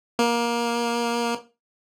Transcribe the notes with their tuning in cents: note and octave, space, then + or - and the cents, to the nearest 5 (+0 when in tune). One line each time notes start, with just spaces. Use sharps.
A#3 +20